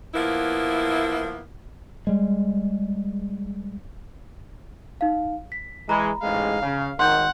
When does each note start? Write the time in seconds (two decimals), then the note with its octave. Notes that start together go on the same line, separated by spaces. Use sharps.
0.14 F3 A#3 B3 E4
2.07 G3 G#3
5.01 D#4 F5
5.52 B6
5.89 E3 G#3 A#5 B5
6.23 A1 G#2 G#3 F5
6.63 C#3
6.99 G#1 D#3 F#5 C6 G6